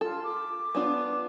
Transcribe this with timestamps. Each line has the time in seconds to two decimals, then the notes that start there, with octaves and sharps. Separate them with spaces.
0.01 F4 A4
0.24 D6
0.75 B3 D4 F4